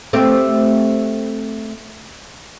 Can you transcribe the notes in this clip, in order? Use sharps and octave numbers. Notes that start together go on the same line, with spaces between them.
A3 C4 G4